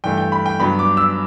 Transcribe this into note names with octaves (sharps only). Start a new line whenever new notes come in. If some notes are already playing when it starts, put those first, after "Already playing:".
G2 E3 A3 G5
G5
B5
G5
G2 F#3 B3 D4 B5
D6
E6